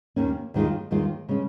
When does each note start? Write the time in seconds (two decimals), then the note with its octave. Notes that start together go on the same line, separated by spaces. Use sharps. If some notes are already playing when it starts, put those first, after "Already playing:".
0.16 D#2 D#3 A#3 C#4
0.54 D#2 D#3 G#3 F4
0.91 D#2 D#3 G#3 F4
1.29 C#3 G#3 C#4